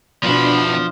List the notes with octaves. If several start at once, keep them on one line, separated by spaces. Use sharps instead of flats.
E2 B2 F3 D4 B5